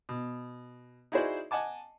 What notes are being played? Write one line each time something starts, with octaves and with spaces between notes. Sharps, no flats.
B2
D#4 E4 F#4 G#4 C5 D5
D#5 F#5 G#5 A5 D6